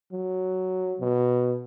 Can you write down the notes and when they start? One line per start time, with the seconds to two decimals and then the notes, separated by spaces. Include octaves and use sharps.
0.12 F#3
1.01 B2